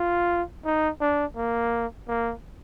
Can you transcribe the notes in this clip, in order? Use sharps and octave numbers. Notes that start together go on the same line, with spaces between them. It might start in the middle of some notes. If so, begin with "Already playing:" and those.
Already playing: F4
D#4
D4
A#3
A#3